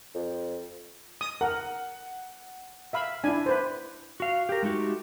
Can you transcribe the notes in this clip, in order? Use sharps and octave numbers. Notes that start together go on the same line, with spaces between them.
F2
D#6
A#4 F#5
E5 F5 B5
D4 E4 G#5
B4 C5
F#4 F5
G4 A#4
G#3 A3 D#4 F#4 G4